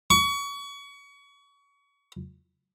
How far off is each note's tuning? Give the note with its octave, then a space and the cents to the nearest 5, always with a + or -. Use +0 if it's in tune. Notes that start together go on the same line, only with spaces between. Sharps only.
C#6 +30